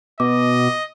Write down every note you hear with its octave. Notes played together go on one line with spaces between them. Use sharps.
B2 D#5 D6